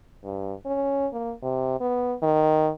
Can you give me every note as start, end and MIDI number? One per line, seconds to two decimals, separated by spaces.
0.24 0.53 43
0.66 1.07 61
1.13 1.32 58
1.42 1.77 48
1.80 2.14 59
2.23 2.70 51